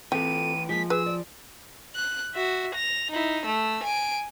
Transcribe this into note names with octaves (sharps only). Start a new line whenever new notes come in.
E3 C4 F4 G4 A4 G5 D#7
F3 G#3 A#3 B6
G#4 B4 E6
D5
F#6
F#4 E5
A#6 F7
D#4 E4
A3 E6
G#5 D7